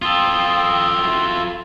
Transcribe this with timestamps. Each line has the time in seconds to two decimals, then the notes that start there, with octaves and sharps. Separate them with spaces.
0.02 F4 A4 F5 G5 D#6
1.02 E4 F#4